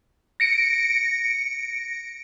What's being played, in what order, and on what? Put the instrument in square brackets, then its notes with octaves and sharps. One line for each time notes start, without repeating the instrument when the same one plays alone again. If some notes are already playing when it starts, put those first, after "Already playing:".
[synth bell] A#6 C#7 D7